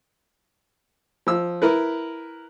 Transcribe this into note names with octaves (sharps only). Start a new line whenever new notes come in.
F3 E6
E4 A#4 B4